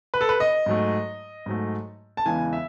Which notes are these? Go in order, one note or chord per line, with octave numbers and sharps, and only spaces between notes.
B4
A4
B4
D#5
G#2 F#3 A3
G#2 F#3 A3
A5
E2 C#3 E3 G#3 G#5
E5